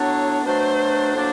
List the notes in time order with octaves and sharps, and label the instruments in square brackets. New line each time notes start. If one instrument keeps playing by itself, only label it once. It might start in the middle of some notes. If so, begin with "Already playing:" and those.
Already playing: [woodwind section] A2 F#3 B3 D4 [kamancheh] C#5
[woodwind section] B2 F#3 A3 D4 [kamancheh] C5
[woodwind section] A2 F#3 A#3 D4